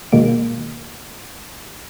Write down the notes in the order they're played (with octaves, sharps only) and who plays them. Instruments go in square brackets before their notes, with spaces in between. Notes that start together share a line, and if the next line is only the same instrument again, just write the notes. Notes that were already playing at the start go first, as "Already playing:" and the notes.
[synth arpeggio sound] B2 D#3 G#3 A#3 D7